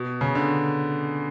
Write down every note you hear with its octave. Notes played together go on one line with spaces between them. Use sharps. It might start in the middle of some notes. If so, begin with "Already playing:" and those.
Already playing: B2
C#3
D3